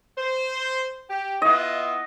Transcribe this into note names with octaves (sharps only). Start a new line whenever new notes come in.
C5
G4
B3 E4 F4 D#5